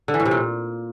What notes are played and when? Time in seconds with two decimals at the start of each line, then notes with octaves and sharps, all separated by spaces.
0.08 D3
0.14 E3
0.20 A2
0.25 C3
0.31 A#2